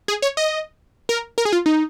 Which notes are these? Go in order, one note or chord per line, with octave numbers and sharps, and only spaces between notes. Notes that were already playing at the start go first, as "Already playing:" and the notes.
G#4
C#5
D#5
A#4
A#4
G#4
F4
D#4